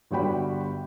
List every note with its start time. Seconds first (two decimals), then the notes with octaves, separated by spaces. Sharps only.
0.11 G1 G3 F#4 G5 B5